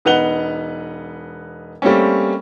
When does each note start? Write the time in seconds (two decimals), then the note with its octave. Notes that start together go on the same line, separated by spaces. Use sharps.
0.05 E1 D#4 B4 F#5 F7 G7
1.82 G3 A3 A#3 C4 C#4